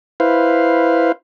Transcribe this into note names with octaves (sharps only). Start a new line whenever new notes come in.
E4 B4 C5 F5